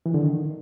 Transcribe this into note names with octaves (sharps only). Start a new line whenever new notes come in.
E3
D3
D#3